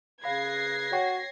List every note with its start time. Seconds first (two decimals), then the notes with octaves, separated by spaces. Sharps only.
0.24 C#3 B4 F5 B5 G#6 A#6 C7
0.92 F#4 C#5 G5 C#6